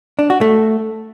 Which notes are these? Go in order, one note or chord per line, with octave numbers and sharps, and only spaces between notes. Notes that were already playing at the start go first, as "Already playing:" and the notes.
D4
F#4
A3